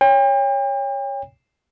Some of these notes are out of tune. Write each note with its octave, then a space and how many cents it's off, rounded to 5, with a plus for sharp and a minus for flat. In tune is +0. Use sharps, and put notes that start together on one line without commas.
C#5 +0 G5 +40